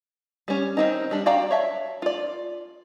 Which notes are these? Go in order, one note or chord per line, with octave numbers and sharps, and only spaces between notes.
G3 C#4
D#3 C4 D#4
G3 D4
F#4 D5 F5 G5 A#5
C#5 E5 A5
F4 D5